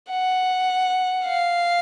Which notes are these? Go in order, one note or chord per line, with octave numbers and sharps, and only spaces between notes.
F#5
F5